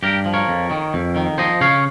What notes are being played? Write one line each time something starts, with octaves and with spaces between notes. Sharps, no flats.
G2 G4 A#4
F3
A#4 C#5
F2
D#3
F2
D#3
F3 C5 D#5
C#3 C#5 F5